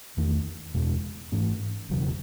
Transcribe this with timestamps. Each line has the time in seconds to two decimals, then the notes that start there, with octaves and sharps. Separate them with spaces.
0.17 E2 D#3 A3
0.74 F#1 E2 B2 G#3
1.32 G#2 E3 A3 C#4
1.89 E1 E2 C#3 F#3